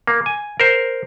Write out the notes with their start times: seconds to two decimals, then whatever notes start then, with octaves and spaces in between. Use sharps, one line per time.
0.07 A#3
0.26 G#5
0.60 A#4 C5